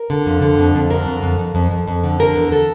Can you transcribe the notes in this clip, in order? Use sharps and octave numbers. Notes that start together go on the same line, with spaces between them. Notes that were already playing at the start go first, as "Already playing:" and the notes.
Already playing: A#4
D3
F2
D3
F2
F2
D3 A#4
F2
F2
F2
F2
F2
F2
D3
D3 A#4
E2
A4